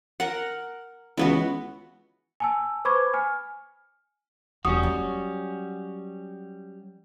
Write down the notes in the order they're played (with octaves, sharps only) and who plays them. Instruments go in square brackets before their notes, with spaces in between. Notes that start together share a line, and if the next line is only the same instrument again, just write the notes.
[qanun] A#4 F#5
[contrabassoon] C#2 [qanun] E3 B3 F#4
[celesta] G#5 A5 E6
B4 C5 B5 C#6 D6 G#6
G#5 F6
[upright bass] E1 [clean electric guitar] G3 C#4 F#4 [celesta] D#6
[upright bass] F#3